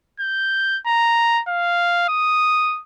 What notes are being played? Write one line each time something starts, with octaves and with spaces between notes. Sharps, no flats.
G6
A#5
F5
D#6